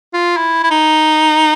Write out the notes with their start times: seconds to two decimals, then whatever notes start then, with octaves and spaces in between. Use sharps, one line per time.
0.14 F4
0.37 E4
0.64 E4
0.71 D#4